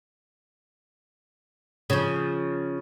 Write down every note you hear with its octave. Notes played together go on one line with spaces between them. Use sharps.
C#3 F3